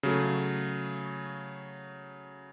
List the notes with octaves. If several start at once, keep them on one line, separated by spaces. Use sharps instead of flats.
C#3 F#3 A3